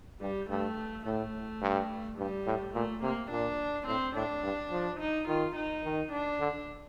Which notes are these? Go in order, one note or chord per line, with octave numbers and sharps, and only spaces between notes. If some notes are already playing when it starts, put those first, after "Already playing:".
G2 G3
G2 A3
A2 A3
G2
G2 G3
A2
A#2 A3
C3 A#3
A#2 D4
A2 C4
A2 D4
G2
F3
D#4
D#3 F4
D#4
D#3
D4
D3